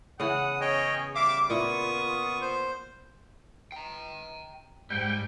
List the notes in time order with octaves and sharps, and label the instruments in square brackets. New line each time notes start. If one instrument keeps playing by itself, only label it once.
[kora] C#3 E3 B3 [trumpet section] F#5 [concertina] D#6
[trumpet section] C#4 G#4 [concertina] C#5 D#5 G5
[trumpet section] G3 D6 [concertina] E5 F5
[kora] A#2 E4 [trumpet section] B3 F4 [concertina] C#6 D#6
[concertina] C5
[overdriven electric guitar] G5 A#5
[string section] G#2 [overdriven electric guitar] G3 [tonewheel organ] G5